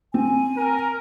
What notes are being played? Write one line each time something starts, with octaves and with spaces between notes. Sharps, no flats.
C4 G#5
A#4